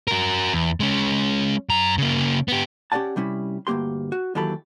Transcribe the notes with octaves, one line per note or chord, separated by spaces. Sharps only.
F#4 A#4
E2
G#3 C#4
F#2 A#5
C#3 A#3
B3 G4
C#4 G4 C5 D5 F#5 A5
C3 G3 C#4 E4
D2 G2 A#3 G4 C6
F#4
D#2 E3 F#3 G4 A4 B5